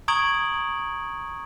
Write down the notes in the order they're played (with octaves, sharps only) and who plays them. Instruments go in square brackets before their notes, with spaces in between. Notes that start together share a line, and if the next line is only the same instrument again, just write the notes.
[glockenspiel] A#5 C#6 D#6 G#6 D7 F#7